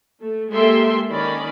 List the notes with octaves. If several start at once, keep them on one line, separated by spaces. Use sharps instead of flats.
A3
G#3 A#3 G4 A4 E5 C6
D#3 C#4 D5 B5